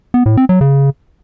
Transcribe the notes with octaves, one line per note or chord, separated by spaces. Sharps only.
B3
A2
C4
F#3
C#3